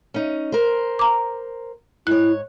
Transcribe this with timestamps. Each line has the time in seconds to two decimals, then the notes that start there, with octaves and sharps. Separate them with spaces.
0.14 C#4 D#4
0.52 A#4 C5
0.99 A#5 D6
2.07 G#2 E4 C#5 F#6